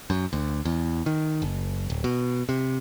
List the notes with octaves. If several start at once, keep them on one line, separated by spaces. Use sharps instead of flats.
F#2
D2
E2
D#3
F#1
D1
B2
C3